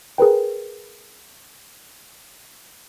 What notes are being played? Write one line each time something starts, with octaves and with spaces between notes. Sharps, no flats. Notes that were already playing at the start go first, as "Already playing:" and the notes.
G#4 A#4 B4 G5